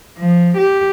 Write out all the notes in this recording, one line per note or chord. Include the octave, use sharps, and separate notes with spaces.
F3
G4